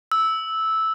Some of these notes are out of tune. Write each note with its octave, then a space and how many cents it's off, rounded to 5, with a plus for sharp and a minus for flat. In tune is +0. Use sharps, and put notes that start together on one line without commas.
E6 -10